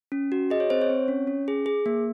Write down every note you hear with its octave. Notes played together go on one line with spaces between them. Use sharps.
C#4
F#4
G#4 D#5
C#5
C4 C5
C#5
C4
C#4
C#4
G#4
G#4
A#3